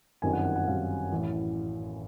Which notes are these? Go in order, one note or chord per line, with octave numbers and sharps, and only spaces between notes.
G1 F#2 D#3 G3 C4 G#5
F#5
F#5
F#5
G1 F#2 D#3 G3 C4 F5
A1 A2 E3